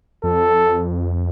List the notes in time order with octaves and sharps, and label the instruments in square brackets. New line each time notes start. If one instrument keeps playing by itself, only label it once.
[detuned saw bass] F2 [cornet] A4